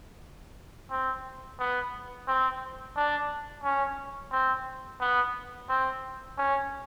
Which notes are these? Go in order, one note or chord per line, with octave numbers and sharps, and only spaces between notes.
C4
B3
C4
D4
C#4
C4
B3
C4
C#4